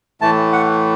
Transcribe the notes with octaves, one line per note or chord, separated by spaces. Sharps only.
A2 E3 A3 A5
F#5